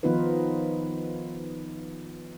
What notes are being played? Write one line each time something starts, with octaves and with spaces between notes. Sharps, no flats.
D#3 F3 B3 D#4 F4 B4